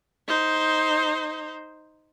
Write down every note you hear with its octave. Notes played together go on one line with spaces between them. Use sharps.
D#4 C5